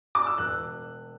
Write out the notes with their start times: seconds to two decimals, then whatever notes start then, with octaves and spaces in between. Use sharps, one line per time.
0.15 D6
0.27 E6
0.38 E1 F#6